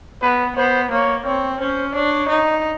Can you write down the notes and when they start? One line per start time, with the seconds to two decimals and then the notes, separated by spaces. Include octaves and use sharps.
0.22 B3 B4
0.56 B3 C5
0.91 A#3 C#5
1.25 C4 C#5
1.60 C#4 C5
1.94 D4 C#5
2.29 D#4